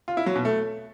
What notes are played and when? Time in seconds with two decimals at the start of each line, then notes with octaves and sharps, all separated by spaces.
0.08 F4
0.17 E4
0.26 F#3
0.36 B2
0.45 A3